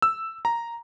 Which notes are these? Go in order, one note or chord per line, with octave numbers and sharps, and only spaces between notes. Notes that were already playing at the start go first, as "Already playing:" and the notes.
E6
A#5